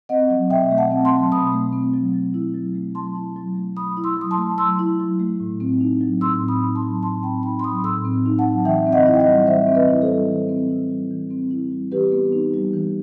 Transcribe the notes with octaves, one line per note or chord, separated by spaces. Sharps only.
C4 D#5 F#5
F#3
B2 E5 G5
A3
F#5 A5
C4
A5 C6
F#3
B2 B5 D#6
A3
C4
F#3
F#3
E4
F#3
A3
F#3 A5 C6
E4
F#3
A3
F#3 B5 D#6
E4
C6 E6
F#3 D#6
A5 C6
A3
F#3 C6 E6
E4
F#3
A3
A2
C4
D#4
F#3
A2 C6 E6
C4
B5 D#6
D#4
A5 C6
F#3
A2 A5 C6
C4 G5 B5
D#4 G5 B5
C6
F#3 B5 D#6
A2 C6 E6
C4
D#4
F#5 A5
F#3
E3 E5 G5
C4
D#5 F#5
E4
G5
D#5 F#5
G3
E3 C5 E5
C4
B4 D#5
E4
A4 C5
G3
E3
C4
E4
G3
E3
C4
E4
G3
E3 G4 B4
B3
D#4
G3
E3